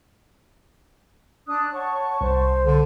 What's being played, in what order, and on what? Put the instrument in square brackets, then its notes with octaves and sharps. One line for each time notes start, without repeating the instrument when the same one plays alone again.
[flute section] D4 D#6 F#6
[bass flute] C#5 [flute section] F#5 A5 C#6
[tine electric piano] C2 [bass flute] C5
[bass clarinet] D3 [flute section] A4